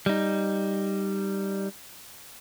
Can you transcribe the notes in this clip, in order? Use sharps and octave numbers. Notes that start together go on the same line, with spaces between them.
G3 D#4